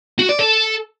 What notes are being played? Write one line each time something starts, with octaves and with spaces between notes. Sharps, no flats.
F#4
D5
A4